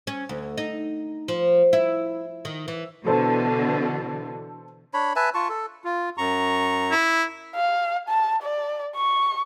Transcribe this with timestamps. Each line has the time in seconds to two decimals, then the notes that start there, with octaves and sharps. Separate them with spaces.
0.07 C#4
0.29 D2
0.58 D#4
1.28 F3
1.73 E4
2.45 D#3
2.68 E3
3.06 B2 D3 E3 A4 C5 A5
4.94 D4 C#5 B5
5.16 B4 E5 G#5 A5
5.34 F4 A5 C#6
5.49 A4
5.84 F4
6.18 F#2 A#5 C#6
6.91 E4
7.55 F5
8.08 A5
8.42 D5
8.95 C#6